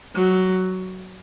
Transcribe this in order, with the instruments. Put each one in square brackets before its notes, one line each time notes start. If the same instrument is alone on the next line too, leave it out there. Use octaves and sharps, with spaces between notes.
[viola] F#3